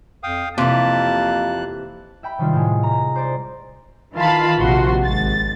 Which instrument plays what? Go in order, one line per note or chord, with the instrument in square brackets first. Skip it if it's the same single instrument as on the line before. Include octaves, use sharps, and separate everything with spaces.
[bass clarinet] F2 [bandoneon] F5 G5 D#6
[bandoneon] F2 F#6 [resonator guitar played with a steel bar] C3 E3 [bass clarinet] A#3 [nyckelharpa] A5
[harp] E5 G5 B5
C3 D#3 G3 F4
A2 G#3
A#5
C5 D5
[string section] D#3 E3 F4 F5 A5 B5
A#1 C3 F3 F#4 C6
G#1 A6